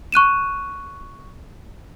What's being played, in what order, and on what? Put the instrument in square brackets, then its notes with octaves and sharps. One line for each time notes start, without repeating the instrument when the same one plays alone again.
[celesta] C#6 F#6 D#7 E7